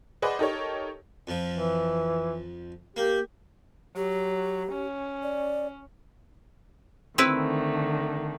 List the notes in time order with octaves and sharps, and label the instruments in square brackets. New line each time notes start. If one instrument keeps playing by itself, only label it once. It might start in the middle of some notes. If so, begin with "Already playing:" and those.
[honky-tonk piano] G#4 B4 C5 D5 D#5 F#5
D#4 G4 A4 A#4 C#5
[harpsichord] F2 F3
[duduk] E3
[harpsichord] A#3 [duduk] G4
[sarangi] F#3 [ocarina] G4
[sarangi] C#4
[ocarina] D5
[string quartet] D3 D#3 A3 [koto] C4 E4 B4